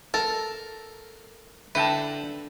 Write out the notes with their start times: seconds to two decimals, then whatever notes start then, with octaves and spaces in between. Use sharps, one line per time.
0.14 A4 A#4
1.75 D3 E4 B4 G5 A5